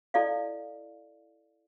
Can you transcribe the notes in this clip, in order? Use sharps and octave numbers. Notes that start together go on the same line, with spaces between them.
E4 A4 D5 D#5 F5